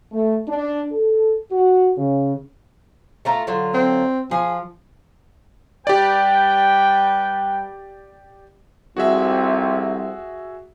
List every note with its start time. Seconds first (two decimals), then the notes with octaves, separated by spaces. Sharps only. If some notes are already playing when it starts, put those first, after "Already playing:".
0.11 A3
0.46 D4
0.91 A4
1.50 F#4
1.97 C#3
3.25 A3 F4 A#5
3.47 D3 F#3 F4
3.74 C4
4.31 F3 G#4
5.87 G3 G4 B4 D5 G5
8.97 C2 F2 C3 F#4 G#4 E5